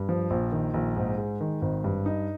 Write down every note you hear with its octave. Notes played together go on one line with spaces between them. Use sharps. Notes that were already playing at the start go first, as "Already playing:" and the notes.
Already playing: G2
F3
A#1
D#3
A#1
G#2
G#3
D#3
G#1
G2
D#4